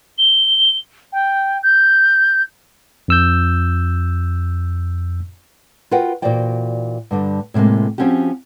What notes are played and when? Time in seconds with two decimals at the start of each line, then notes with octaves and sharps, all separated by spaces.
0.18 G7
1.12 G5
1.63 G6
3.08 F2 E6 G6
5.91 F4 F#4 A#4 B4 F#5 G5
6.22 A#2 E3 F#4 C5 D5 G5
7.11 G2 D3 G3
7.54 A2 C3 E3 G#3 A#3
7.98 F3 C4 C#4 F#4 G4